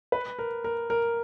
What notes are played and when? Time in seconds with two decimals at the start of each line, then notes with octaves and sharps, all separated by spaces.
0.12 B4
0.39 A#4
0.64 A#4
0.90 A#4